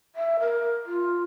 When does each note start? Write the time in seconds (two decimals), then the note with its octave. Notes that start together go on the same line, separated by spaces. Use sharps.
0.16 E5
0.40 A#4
0.86 F4